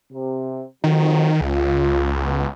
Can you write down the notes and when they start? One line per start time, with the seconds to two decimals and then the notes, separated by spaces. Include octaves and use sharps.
0.11 C3
0.84 F2 D#3 F3 F#3
1.41 C#2 F4
2.20 A1 B2 B3